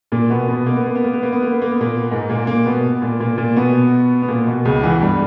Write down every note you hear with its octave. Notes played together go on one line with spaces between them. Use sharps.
A#2 A#3
B2 B3
B2 B3
A#3
B3
A#3
B3
A#3
B3
A#3
B3
A#3
B3
A#3
B3
A#2 A#3
G#2 G#3
A#2 A#3
A#2 A#3
B2 B3
A#2 A#3
A#2 A#3
A#2 A#3
B2 B3
B3
A#2 A#3
B2
C#2 C#3
E2 E3
G2 G3